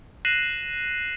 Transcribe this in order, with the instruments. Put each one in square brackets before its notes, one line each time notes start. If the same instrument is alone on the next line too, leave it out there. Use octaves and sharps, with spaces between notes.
[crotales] F#6 A#6 C7 D#7 E7 F#7